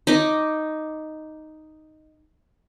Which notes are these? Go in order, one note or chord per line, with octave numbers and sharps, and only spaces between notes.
D#4 D#5 D6